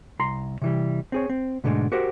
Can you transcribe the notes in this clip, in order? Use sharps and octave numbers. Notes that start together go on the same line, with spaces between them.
C2 A#5 C6
C3 E3 G3
C4 G#4 C#5
C4
G#2 B2 D3 E3 G#3 A3
F#4 G4 A#4 C5 F#5